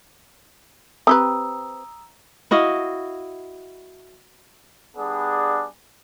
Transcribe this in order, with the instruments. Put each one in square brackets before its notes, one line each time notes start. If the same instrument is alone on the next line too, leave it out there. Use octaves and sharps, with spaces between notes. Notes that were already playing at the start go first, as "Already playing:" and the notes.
[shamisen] C4 G4 B4 [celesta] A#5 D#6 E6
[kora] E4 F#4 D#5 F5
[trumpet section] G3 B3 D4 G#4